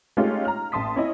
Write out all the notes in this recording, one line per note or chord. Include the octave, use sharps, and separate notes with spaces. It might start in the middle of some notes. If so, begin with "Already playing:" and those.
G#3 A3 C#4 D#4 F4 G4
A#5 F6
A1 A5 C6 D#6 B6
C#4 E4 D#5